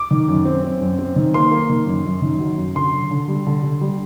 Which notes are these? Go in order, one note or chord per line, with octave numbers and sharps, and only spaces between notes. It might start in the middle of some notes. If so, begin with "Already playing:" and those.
Already playing: D6
D#3
F#2
C4
C4
F#2
C4
D#3
A#3 C6
A#3
D#3
F#2
F#2
D#3
F#3
F#2
D3 C6
D3
D3
G3
D3
D3
G3